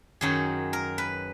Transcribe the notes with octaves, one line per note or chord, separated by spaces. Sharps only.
F#2 D#3 F#3 G#4
A#4
B4